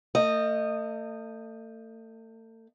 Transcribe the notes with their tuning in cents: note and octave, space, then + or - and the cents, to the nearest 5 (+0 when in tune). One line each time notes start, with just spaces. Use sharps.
A3 +40 D#5 -15